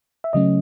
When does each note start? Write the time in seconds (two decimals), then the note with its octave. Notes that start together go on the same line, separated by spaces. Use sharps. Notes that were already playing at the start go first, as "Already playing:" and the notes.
0.24 E5
0.33 C#3 F#3 A3 C#4 D#5